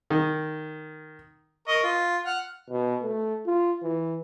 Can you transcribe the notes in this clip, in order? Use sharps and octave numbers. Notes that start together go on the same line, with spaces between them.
D#3
A#4 D#5 C#6
F4
F#5 F6
B2
A3
F4
E3